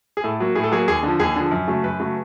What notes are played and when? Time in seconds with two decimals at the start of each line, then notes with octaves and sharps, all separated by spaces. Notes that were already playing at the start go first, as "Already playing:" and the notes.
0.17 G#4
0.24 A2 A4
0.40 F#3 A#3
0.55 A2 G#4
0.63 A4
0.72 F#3 A#3 G#4
0.88 D#2 G#4
1.03 D3 F3
1.19 D#2 G#4
1.36 D3 F3
1.51 F#2
1.68 C#3 F#3 A3
1.84 F#2 B4
2.00 C#3 F#3 A3